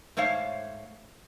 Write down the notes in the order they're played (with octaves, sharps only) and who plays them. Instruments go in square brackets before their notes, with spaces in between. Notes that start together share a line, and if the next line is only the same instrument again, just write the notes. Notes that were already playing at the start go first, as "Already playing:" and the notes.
[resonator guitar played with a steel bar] G#2 A3 C5 C#5 F5